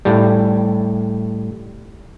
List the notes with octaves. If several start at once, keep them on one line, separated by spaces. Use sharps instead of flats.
A2 G3